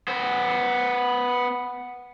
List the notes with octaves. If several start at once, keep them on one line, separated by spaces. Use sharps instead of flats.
B3 C5